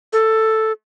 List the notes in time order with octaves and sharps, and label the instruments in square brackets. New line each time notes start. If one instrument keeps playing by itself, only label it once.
[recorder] A4